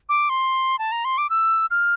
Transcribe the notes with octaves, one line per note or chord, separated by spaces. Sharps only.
D6
C6
A5
A#5
C6
D6
E6
F6